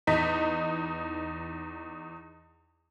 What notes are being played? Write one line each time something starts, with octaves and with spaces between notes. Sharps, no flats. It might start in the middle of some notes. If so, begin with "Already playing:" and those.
E2 D#4 B6